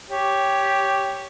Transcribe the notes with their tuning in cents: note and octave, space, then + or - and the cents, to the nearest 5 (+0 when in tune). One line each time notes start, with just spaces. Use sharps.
G4 +0 C#5 +5